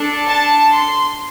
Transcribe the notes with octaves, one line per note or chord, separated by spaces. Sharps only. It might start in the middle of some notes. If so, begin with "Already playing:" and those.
Already playing: D4 A4
A5
C6